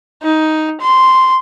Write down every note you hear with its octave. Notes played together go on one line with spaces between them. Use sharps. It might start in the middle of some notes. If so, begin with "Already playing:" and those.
D#4
C6